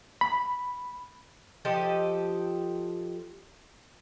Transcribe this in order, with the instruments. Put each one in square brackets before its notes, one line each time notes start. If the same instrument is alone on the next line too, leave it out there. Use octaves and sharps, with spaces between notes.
[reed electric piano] B5
[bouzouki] F3 G4 A4 D#5